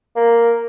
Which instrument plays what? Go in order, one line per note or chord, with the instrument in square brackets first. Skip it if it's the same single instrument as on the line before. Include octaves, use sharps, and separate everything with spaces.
[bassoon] A#3